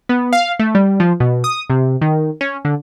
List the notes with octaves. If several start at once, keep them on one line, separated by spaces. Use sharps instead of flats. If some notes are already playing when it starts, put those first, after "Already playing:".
B3
F5
A3
G3
F3
B2
D#6
C3
D#3
C#4
D3